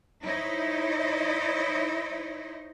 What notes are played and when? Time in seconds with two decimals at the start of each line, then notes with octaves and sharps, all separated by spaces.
0.23 D#4 E4 C5 C#5 D#5